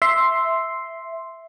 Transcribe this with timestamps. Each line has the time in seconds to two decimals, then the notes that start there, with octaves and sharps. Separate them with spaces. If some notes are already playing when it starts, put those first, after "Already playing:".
0.02 E5 C6